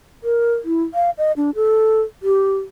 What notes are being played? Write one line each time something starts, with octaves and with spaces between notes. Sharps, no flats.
A#4
E4
F5
D#5
D4
A4
G4